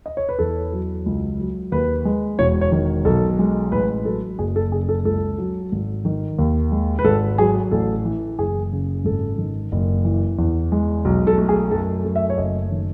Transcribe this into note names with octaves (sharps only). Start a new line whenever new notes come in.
D#5
C#5
B4
E2 A4
F#3
C#2
F#3
D#2 B4
G#3
E1 C#5
C#5
D#3
B1 A4
G#3
A1 B4
F#3 A4
F#1 G#4
A4
C#3 G#4
A4
C#2 A4
F#3
G#1
D#3
D#2
G#3
B4
G#1 A4
F#3 G#4
A1 A4
E3
F#1 G#4
C#3
G#1 A4
D#3
F#1
E3
E2
G#3
B1
A4
A3
G#4
F#2 A4
A3
E5
C#5
F#1 D#5
D#3